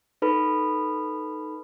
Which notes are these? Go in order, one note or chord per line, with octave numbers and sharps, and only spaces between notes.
D#4 A4 B4 B5